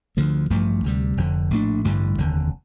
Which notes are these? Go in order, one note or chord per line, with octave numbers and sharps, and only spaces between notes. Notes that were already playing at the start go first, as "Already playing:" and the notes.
D2 D3 F3 A3
A1 G2 F3 A3
D2 C3 G3
F1 F2 D3
A#1 A2 A3 D4
A1 G2 D3 G3
F1 D#2 D3